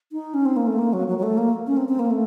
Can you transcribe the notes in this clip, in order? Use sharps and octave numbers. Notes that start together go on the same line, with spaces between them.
D#4
C#4
C4
A#3
A3
A#3
F#3
F#3
F#3
A3
A#3
C#4
C4
C4
A#3
A3